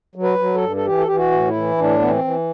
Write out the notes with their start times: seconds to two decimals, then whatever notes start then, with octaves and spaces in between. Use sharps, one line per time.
0.15 F#3
0.23 B4
0.39 F#3
0.55 A4
0.61 G2
0.76 A4
0.85 E3 G4
0.98 A4
1.07 E3 G4
1.16 F#4
1.31 A2
1.48 E4
1.55 E3
1.78 A2 D4
1.99 E3 B3
2.09 C4
2.24 E3